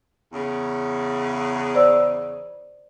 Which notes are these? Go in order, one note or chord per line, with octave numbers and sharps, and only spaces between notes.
E2 C#3
C5 D5 E6